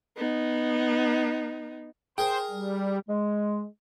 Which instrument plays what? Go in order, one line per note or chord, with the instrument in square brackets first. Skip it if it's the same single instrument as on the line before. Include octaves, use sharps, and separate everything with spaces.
[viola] B3 D#4
[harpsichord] G#4 A#4 [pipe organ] C5 [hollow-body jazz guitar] G5
[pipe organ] G3
[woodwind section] G#3